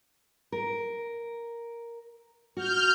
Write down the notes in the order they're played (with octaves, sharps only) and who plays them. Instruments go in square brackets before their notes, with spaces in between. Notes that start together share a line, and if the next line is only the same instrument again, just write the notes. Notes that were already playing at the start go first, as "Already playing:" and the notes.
[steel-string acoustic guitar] A#4
[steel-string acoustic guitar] F#4 [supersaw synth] F6 G6